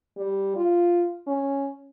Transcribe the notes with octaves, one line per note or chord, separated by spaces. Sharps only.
G3
F4
C#4